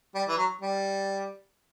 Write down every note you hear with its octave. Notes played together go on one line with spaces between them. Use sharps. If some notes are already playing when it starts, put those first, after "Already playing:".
G3
E3
F#3
G3